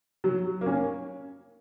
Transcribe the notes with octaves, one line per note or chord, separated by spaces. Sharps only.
F#3
A#3
C#4